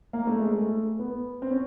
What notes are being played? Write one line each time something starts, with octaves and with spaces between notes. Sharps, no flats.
A#3
A3
G#3
A3
B3
C4
C#4